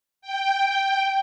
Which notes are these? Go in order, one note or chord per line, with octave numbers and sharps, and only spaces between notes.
G5